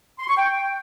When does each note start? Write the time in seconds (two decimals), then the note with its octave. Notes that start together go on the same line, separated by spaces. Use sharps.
0.19 C6
0.28 C#6
0.37 G5